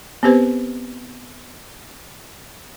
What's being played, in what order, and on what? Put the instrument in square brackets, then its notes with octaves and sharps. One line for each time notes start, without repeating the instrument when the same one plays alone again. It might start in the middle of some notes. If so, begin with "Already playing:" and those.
[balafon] B3 C4 G4 B4 C5